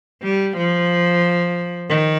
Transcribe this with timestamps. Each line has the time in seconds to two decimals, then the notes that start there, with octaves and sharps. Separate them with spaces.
0.23 G3
0.57 F3
1.89 D#3